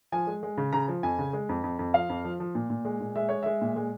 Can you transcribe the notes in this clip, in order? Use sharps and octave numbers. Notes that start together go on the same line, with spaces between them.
F3 G#5
G#3
G#3
C#3
C#3 A#5
F3
F2 G#5
C#3
G#3
F2
F2
F2
F3 F5
F2
F3
F3
A#2
A#2
G#3
A#2
G#3 E5
G#3 C#5
G#3 E5
A#2
G#3